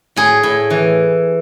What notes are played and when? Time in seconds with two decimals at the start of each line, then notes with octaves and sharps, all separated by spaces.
0.16 A2 G#4
0.43 A2
0.70 E3